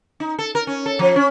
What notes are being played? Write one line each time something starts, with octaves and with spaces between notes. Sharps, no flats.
D#4
A4
A#4
C#4
A4
F3
C#4